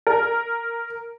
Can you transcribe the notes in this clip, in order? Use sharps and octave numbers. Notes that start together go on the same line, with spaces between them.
A#4